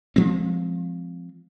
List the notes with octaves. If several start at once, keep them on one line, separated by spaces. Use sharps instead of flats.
F3 G#3 C4